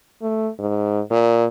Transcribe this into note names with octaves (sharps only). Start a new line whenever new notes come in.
A3
G#2
A#2